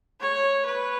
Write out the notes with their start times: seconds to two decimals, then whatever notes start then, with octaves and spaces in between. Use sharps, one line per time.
0.21 C#5
0.66 B4